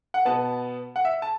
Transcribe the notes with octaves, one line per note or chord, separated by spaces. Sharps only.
F#5
B2 B3 A5
F#5
E5
A5